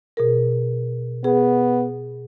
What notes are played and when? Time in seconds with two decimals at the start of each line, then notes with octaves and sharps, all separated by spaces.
0.17 B2 G#4 A#4
1.24 B3 G#4